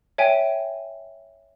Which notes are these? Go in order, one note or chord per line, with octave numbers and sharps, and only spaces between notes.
C#5 E5 G5 G#5